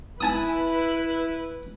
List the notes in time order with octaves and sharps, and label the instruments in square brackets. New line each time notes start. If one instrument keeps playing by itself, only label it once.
[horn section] E4 [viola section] B4 [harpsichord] G#5 A5 D#6